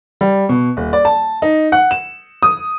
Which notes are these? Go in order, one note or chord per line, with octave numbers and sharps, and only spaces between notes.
G3
B2
D#1
D5
A5
D#4
F#5
E7
D#6